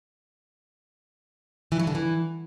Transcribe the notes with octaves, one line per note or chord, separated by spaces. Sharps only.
E3
F#3
D3
E3